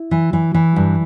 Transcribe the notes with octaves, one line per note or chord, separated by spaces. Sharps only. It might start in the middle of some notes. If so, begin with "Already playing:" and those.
Already playing: E4
E3
E3
E3
G2